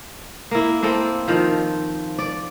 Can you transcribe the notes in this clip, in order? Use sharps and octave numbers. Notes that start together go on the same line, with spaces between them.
A#3 E4
A#3 C4 A4
D#3 F3
D5